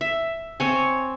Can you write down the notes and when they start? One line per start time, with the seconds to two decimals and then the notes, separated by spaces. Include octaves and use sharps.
0.01 E5
0.60 C4 C#5 G#5